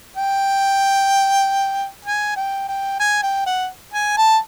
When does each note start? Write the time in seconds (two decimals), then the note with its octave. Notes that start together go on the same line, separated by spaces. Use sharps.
0.17 G5
2.05 G#5
2.36 G5
2.68 G5
3.00 G#5
3.23 G5
3.46 F#5
3.94 G#5
4.17 A5